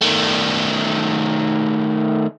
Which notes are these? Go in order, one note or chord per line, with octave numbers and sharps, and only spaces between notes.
D#3 A3